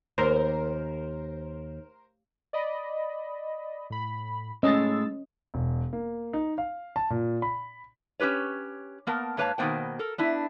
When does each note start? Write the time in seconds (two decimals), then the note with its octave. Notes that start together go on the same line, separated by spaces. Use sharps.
0.18 D#2 A#4 C5
2.53 D5 D#5 B5
3.90 A2 B5
4.63 A2 G#3 C#4 D#5 E6 A6
5.54 E1
5.93 A#3
6.33 D#4
6.58 F5
6.96 A5
7.10 A#2
7.42 B5
8.20 C#4 D#4 G4 B4 C#5
9.07 A#3 B3 A#4 A5
9.37 G#2 A#3 B4 C#5 F5 A5
9.58 B2 D#3 A#3 B3 C5 G5
9.99 A4 A#4
10.18 B3 D4 E4